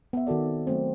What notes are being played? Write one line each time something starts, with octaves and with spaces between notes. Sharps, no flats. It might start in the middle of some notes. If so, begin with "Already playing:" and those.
B3 E5
D#3 F#4 A4 D5
C4
F#3 A3 C4